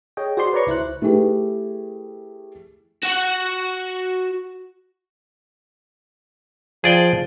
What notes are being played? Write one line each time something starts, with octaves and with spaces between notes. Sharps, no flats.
G#4 C#5 D#5 G5
F#4 G#4 C5 D5 C6
B4 C#5 D5 A#5 C#6
C#2 E4 C5 F#6
A3 E4 G4 G#4 B4
F#4 F#5
F3 G#4 D5 G5